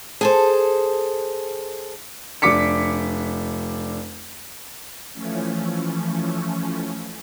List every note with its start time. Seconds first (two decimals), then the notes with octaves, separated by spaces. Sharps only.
0.21 G#4 A4 C5
2.42 F1 D4 D6 B6 C#7
5.13 E3 F3 A3 C#4